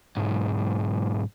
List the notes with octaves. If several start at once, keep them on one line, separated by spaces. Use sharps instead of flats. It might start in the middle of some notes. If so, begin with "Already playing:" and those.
B1 G#2